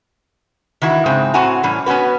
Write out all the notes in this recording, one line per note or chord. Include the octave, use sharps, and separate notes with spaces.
D#3 E3 E4 F#4
G#2 C#3 G#3 C4
A2 C4 F#4 F#5 G#5 A#5
A2 E3 G3 C#4
B3 C#4 D#4 F#4 B4